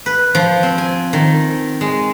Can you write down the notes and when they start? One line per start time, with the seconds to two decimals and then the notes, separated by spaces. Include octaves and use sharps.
0.06 B4
0.35 F3
0.63 C4
0.78 G#5
1.13 D#3
1.81 G#3